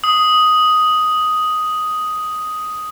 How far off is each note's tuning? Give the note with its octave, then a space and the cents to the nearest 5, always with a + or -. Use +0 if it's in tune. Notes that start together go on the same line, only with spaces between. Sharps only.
D#6 +5